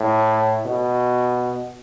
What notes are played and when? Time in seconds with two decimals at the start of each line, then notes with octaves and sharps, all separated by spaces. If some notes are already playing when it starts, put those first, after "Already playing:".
Already playing: A2
0.66 B2